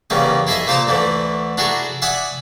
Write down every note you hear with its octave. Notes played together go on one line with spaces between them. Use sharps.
E2 C#3 G3 A#3 D#5
E4 G#4 A4 D#5 E5
A#2 A#3 C5 A5 A#5 D#6
D2 D3 E3 A3
D4 E4 F#4 G#4 A4 A#5
D5 E5 F#5 G#5 D#6